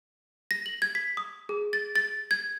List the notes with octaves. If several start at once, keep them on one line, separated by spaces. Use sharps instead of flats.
A#6
F#7
G#6
B6
D#6
G#4
A6
A6
G#6